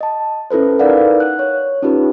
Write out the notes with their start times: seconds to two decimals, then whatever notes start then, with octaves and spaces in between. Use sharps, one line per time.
0.01 D#5 A5
0.51 C#4 E4 A4 B4 C5
0.79 D#4 A#4 B4 D5 F5 F#5
1.20 F#6
1.39 C#5
1.83 C#4 D#4 F4 G4 B4